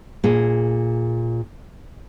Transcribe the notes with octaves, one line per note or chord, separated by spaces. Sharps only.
A#2 G#4